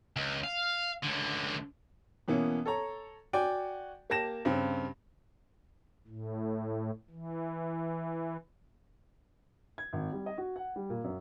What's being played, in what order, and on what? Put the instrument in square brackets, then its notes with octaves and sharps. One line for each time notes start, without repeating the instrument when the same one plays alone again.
[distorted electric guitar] C#2
F5
C#2 D3
[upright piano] B2 E3 A#3 B3 C#4
A4 C#5 A#5
F#4 D5 G5 G#5
A#3 G4 A5 A#6 E7
G2 C#3 C4
[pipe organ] A2
E3
[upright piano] G#6
G#1
G3
D#5
F#4
F#5
G3
A#2
F#2